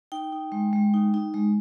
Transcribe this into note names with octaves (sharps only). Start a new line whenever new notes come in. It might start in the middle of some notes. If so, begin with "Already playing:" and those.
D#4 G5
D#4
G#3
G#3
D#4
D#4
G#3